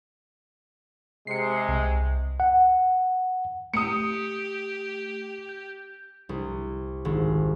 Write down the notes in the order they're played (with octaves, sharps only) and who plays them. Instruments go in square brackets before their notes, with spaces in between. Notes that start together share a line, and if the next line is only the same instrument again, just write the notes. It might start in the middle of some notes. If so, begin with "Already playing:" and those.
[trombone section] C3 G#3 [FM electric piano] C7 C#7
[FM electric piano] C2
[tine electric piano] F#5
[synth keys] A3 [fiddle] G4 [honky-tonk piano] D#6 C#7
[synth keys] G6
[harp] C2
G#1